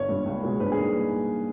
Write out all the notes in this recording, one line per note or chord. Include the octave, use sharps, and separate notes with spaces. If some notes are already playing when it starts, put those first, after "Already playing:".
Already playing: G1 C#5
G2 G3
C#2
B2 G#3
G2 B4
G#4
G3 A#3 D#4